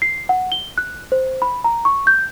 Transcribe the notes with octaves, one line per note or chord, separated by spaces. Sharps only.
C7
F#5
G7
F#6
C5
B5
A#5
C#6
G6